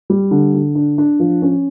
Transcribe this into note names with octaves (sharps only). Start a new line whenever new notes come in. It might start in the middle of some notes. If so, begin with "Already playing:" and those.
G3
D3
D3
D4
D4
F3
C#4